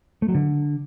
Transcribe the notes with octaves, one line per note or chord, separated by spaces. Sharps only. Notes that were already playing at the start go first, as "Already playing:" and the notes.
A3
F#3
D3